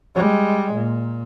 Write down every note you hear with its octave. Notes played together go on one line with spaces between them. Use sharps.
G3 G#3
A#2